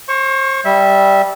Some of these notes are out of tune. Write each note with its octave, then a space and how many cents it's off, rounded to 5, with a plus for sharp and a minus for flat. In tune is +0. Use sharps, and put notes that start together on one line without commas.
C5 +35 C#6 -5
G3 +0 E5 -15